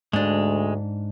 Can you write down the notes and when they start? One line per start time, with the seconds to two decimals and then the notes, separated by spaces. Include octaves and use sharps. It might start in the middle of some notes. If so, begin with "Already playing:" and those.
0.13 D2 G#2 G#3 D4